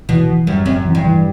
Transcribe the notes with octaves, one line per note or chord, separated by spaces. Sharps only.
B2 E3
E3
F#2 G3
F#2 C4
E3
G2
E3